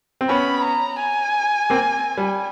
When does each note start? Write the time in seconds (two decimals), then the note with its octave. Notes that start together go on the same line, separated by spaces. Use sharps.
0.21 C4
0.29 B3 C#4 B5
0.64 A#5
1.00 G#5
1.70 A#3 C4
2.17 G3